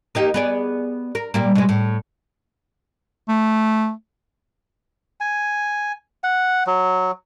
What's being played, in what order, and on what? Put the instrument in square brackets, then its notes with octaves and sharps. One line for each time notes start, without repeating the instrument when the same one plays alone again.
[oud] A#3 D#4 G4
B3 G#4 D5
A#4
A#2 G3 A#3
B2 G#3
A2
[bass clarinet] A3
[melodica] G#5
F#5
F#3